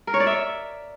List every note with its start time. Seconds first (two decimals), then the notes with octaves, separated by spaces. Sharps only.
0.07 A#4
0.14 C#5
0.20 D5
0.27 E5